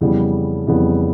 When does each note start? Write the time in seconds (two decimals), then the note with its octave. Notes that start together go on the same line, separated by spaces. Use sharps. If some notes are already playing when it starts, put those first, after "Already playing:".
0.01 F2 C#3 E3 G3 B3
0.67 F2 C#3 E3 G3 B3